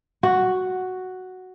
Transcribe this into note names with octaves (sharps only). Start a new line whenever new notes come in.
F#4